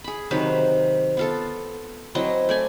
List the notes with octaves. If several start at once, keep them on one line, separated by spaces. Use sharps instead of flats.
G#4 B5
C3 D#3 F#3 B4
B3 F4 A4
F#3 C4 E4 D#5
A3 D5 G#5